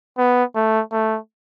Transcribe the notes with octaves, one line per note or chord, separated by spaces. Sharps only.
B3
A3
A3